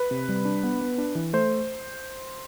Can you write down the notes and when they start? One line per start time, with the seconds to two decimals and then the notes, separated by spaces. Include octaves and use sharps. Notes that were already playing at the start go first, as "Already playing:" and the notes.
Already playing: B4
0.11 C3
0.29 G3
0.45 D4
0.63 B3
0.81 B3
0.98 D4
1.15 E3
1.33 A3 C5